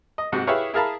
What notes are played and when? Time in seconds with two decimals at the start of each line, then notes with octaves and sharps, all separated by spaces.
0.18 D#5
0.32 G#2 C3 F#4
0.47 E4 G4 G#4 B4 C#5 F5
0.74 E4 G#4 A#4 F5 A5 B5